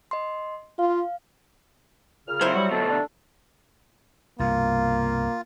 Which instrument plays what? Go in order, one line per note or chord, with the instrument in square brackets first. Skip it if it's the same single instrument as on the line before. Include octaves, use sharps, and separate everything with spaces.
[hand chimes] D#5 C6
[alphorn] F4 [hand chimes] F5
[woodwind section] A#2 C#3 F6
[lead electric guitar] F#3 C4 [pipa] E4 C5
[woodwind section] F#3 [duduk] G3 [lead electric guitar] F#4
[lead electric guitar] D2 B2 [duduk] A4
[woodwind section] D4
[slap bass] C2 G2 B2 [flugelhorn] A#3 [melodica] F4